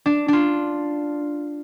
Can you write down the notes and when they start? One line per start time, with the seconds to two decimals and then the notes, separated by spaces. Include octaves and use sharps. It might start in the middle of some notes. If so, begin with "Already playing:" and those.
0.06 D4
0.28 D4 F4